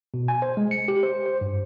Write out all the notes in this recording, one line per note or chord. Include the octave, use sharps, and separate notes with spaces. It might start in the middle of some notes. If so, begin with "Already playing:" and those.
B2
G#5
C5
G#3
C#7
G4
C5
C5
G2